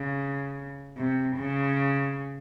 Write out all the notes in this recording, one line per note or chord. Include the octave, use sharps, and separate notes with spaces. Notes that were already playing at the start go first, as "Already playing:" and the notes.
Already playing: C#3
C3
C#3